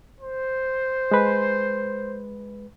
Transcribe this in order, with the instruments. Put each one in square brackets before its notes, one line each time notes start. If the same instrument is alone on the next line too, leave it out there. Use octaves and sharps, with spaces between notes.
[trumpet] C5
[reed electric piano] G#3 B4